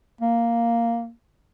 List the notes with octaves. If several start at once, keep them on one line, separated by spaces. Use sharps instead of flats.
A#3